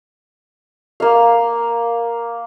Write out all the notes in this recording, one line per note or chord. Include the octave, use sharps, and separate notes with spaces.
A#3 F5